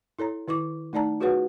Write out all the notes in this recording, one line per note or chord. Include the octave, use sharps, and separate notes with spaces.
E4 A4 C#5 A#5
D#3 E4 C#6 D6
A3 D#4 D5 A5 A#5
F4 F#4 G#4 B4 C#5 F#5